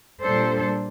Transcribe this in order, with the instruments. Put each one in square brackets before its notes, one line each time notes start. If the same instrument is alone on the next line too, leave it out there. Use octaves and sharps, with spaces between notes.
[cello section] A#2 G3 D4 A4 C5